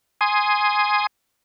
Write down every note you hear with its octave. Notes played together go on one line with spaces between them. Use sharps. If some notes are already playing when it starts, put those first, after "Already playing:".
G#5 C6 D#6